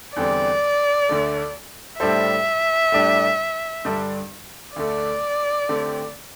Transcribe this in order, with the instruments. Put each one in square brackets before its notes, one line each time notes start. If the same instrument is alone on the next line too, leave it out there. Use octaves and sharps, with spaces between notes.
[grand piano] E2 D3 G3 C4 [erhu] D5
[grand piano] D2 D3 A3
[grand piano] A2 G3 D4 A4 C5 [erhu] E5
[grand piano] A2 G3 D4 G4
G2 D3 G3 D4 A4
[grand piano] D2 D3 A3 [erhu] D5
[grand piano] D3 A3 C4 G4